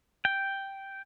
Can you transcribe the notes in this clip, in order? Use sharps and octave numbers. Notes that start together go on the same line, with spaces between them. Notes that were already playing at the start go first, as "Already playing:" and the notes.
G5